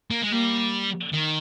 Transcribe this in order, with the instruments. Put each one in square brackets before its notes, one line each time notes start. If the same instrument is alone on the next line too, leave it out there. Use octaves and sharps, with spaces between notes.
[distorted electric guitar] A#3
G#3
[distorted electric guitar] G3 [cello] A#3
[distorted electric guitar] D#3